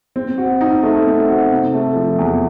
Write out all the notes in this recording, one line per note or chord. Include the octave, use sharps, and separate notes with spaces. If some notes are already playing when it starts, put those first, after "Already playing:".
C4
F#4
D#4
A3
C4
F#4
C3
A3
F3
E2